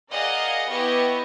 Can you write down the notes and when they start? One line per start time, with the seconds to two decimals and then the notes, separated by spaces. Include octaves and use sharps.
0.10 G#4 A#4 D5 D#5 F5 F#5
0.69 B3 E4 G4 D#5 C#6